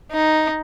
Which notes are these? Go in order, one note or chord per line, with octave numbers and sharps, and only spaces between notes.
D#4